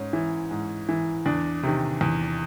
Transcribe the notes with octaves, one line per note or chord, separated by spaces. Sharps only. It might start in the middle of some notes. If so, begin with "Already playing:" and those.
Already playing: G#2 C#4
E3
G#2
E3
E2 D4
C3 D#3
E2